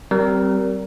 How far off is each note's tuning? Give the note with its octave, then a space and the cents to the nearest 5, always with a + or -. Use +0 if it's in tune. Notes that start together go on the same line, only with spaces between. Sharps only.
G3 -25 C4 +0 A#4 +0